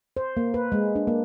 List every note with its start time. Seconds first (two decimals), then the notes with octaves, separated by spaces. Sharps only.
0.17 C5
0.37 A#3
0.54 B4
0.72 G#3
0.95 D4
1.07 A#3